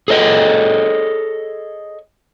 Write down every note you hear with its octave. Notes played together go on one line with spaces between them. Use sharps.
G#4 A4 C#5 D#5